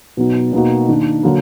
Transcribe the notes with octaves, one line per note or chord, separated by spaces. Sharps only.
B2 F#3 B3 D#4 F#4
B2 A#3 D#4 F#4
D#3 A#3 D4
D3 F#3 A#3